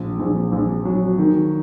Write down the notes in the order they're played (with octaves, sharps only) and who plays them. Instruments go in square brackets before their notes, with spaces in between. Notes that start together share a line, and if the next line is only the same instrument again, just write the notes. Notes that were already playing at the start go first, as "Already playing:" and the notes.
Already playing: [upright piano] A#1
A#1
A#1
F#3
D#3